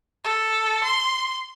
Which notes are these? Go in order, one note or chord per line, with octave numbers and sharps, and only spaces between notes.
A4
C6